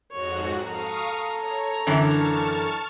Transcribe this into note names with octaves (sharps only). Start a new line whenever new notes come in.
F2 G#2 F#4 C#5
A4 F5 A#5 C#6 D#6
C#5
F#2 D3 E3 A5 C#6 F6